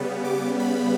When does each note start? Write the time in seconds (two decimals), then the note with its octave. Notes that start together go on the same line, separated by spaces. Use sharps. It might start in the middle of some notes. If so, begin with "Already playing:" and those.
Already playing: C#3 G3 B3
0.25 D6
0.60 B5